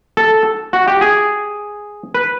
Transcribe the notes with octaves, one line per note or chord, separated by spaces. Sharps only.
A4
F#4
G4
G#4
B4